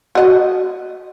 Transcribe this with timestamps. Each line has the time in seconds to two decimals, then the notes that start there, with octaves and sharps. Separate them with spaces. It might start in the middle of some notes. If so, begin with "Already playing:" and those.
0.15 F#4 D#5